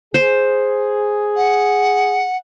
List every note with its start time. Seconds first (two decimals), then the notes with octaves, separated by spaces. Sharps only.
0.14 G#4 C5
1.37 F#5